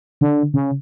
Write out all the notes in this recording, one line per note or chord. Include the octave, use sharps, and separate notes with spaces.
D3
C#3